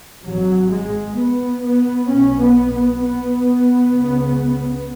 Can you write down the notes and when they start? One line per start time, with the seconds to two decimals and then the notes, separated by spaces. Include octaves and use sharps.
0.25 G#1 G#2 F#3
0.71 G#3
1.17 B3
1.64 B3
2.09 B1 B2 C#4
2.40 B3
2.71 B3
3.01 B3
3.93 C#2 C#3